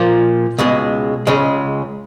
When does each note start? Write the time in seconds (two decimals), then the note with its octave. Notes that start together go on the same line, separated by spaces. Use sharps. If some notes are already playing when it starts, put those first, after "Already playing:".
Already playing: A#2 F3 A#3
0.58 C#2 B2 G#3
1.27 C#2 C#3 G#3 C#4